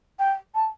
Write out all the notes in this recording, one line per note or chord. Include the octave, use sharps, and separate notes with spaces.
G5
A5